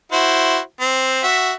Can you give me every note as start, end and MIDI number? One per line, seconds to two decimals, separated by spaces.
0.12 0.59 64
0.12 0.59 66
0.12 0.59 72
0.80 1.22 60
1.23 1.52 66
1.23 1.52 76